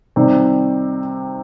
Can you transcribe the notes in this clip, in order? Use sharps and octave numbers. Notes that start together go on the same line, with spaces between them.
C3 D#3 G3 C4